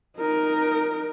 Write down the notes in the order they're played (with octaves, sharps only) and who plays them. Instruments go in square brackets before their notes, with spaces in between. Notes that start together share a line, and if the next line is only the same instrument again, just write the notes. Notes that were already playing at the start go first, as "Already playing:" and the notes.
[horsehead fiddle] D#4 A#4